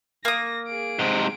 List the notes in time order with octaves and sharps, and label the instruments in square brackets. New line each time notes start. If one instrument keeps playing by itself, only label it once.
[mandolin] A#3 D#6 [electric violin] A#6
[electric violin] G#4 D7
[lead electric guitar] G#2 C3